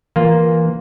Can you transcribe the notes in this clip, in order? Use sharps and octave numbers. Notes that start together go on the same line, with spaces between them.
E3 A#3 F4